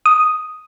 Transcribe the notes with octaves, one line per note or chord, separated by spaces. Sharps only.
D#6